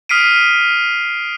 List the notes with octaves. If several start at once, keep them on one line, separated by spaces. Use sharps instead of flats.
D#6 F6 B6 C7 D7 D#7